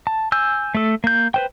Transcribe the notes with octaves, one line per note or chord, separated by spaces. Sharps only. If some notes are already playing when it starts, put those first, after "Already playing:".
A5
G#5 E6 G6
A3 A4
A#3 G6
B4 C5 G5